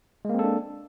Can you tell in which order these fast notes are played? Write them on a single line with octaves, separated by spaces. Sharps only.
G#3 A#3 C4 A4 D4